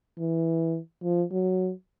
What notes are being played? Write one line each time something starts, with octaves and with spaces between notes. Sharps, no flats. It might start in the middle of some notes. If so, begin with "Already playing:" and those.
E3
F3
F#3